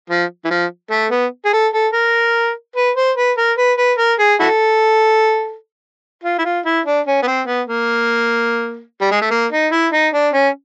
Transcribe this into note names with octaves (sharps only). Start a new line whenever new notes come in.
F3
E3
F3
A3
B3
G#4
A4
A4
A#4
B4
C5
B4
A#4
B4
B4
A#4
G#4
E4 F#4 A4
F4
E4
F4
E4
D4
C#4
B3
C4
B3
A#3
G3
G#3
A3
A#3
D#4
E4
D#4
D4
C#4